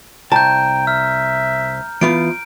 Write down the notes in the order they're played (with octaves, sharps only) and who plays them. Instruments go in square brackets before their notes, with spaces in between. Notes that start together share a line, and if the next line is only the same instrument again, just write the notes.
[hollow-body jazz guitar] C2 A5 [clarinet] G5 [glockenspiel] A#5 G6
[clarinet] E5 [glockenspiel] F6
[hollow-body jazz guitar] E3 B3 F4 [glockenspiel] D7